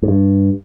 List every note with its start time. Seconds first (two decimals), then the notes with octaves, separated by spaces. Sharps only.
0.03 G#2
0.08 G2